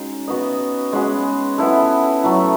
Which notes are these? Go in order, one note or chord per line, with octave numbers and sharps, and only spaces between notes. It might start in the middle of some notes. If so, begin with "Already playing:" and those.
Already playing: G#3 C#4 D#4 F#4 G#4
B3 F#4 B4 D#5
G#3 C#4 F#4 B4
B3 E4 A4
F#3 A3 E4